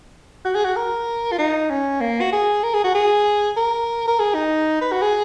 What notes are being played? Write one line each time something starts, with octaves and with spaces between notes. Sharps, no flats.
F#4
G#4
F#4
A#4
F4
D#4
C#4
A#3
F#4
G#4
A#4
G#4
F#4
G#4
A#4
A#4
G#4
D#4
B4
F#4
G#4